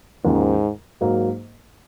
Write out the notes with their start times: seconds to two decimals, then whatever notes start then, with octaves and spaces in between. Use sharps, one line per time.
0.24 D#2 G#2 C#3 F3
1.01 G#2 F#3 A#3